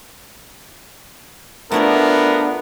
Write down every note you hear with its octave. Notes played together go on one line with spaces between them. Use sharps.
F3 A3 B3 D4 E4 A#4 D5